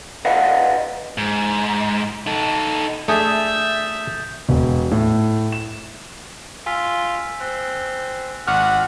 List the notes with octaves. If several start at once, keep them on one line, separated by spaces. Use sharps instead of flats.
B4 D5 D#5 F5 F#5
G#2
D#4 A4
A3 D4 G#4 E5 D#6 G6 A6
E1
A2
E7
F4 G#5 E6 B6
C4 F#6
G#1 F#4 F#5 D6 F6